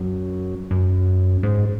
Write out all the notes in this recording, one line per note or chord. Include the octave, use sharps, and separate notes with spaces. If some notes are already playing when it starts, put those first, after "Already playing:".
Already playing: F#2
F#2
G#2